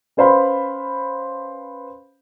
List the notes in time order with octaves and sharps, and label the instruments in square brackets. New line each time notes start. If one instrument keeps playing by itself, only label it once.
[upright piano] C#4 B4 C5 F5 B5